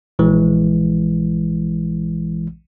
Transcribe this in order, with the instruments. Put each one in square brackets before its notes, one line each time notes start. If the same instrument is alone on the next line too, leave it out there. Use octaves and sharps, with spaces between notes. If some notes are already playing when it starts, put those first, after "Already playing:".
[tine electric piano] A#1 E3 G#3